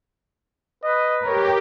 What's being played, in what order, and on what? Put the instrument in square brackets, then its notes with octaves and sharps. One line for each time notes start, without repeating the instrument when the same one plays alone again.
[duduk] B4 [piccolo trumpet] D#5
[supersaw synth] G4 [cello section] A#4 [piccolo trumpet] C#5